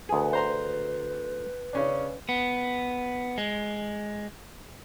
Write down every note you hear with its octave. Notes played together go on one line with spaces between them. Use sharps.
D2 G#4 B4
C5 A#5 C6
C#3 C#4 D4
B3
G#3